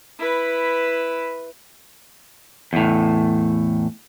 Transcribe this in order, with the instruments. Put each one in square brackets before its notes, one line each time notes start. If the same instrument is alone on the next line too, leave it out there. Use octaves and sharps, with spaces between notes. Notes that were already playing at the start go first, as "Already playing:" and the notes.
[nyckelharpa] E4 B4
[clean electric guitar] E2 A2